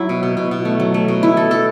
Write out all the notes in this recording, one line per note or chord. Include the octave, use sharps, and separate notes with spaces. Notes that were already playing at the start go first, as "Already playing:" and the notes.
Already playing: F#3 E4
B2
B2
B2
B2
A3
F#3
A3
B2
E4
A4
A4